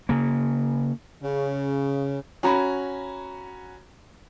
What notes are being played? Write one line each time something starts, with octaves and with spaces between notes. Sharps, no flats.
C#3 A#3
C#3
C#4 F#4 A#5 B5